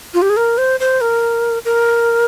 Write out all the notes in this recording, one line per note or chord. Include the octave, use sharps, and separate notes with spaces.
F4
G4
G#4
A#4
C5
C5
A#4
A#4